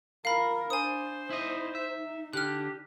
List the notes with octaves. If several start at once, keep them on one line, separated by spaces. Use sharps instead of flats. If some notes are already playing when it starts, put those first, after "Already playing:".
F4 A#4 F5 B5
D4 C5 G#5 D#6
D#4 E4 D#5
E5
D3 G4 F6 F#6